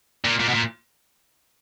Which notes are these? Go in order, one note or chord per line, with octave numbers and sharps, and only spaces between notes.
A#2
A#2
B2
A#2